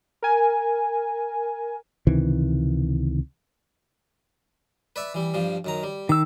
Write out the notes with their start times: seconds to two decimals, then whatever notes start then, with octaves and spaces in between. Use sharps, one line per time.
0.23 A#4 G#5
2.07 C#2 C3 D#3 E3
4.96 B4 D5 E5
5.14 E3 G3
5.34 G2 F3 G3
5.65 F#2 D#3 A#5
5.83 G3
6.09 D#3 D6 E6